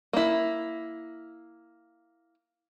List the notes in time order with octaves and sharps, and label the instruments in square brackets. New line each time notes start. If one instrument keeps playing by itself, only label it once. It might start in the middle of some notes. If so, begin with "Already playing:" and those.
[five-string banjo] A#3 E4